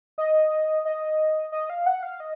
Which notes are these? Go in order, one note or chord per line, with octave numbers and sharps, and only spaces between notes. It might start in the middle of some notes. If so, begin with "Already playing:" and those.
D#5
D#5
D#5
F5
F#5
F5
D#5